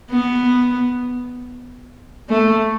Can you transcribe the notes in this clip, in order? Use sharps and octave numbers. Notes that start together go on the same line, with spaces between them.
B3
A3